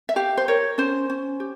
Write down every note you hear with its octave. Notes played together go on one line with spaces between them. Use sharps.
E5
G4 F5
C5
A#4 C#5
C#4 C5
C#4
G4